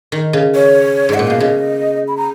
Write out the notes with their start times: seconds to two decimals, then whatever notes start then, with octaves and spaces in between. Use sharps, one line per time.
0.12 D#3
0.33 C#3
0.55 C#5
1.09 G#2 F#5
1.19 A#2
1.27 B2 F5
1.40 C#3 D#5
2.08 B5
2.17 A#5